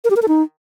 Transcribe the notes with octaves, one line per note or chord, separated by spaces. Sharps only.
A#4
G4
A#4
A4
D#4